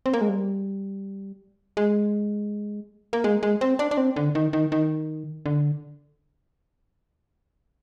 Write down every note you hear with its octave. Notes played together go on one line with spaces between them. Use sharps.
C4
A#3
G#3
G3
G#3
A#3
G#3
G#3
C4
D4
D4
C4
D3
D#3
D#3
D#3
D3